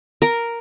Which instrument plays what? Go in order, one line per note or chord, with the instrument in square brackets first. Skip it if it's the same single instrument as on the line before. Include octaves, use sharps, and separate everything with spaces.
[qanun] A#4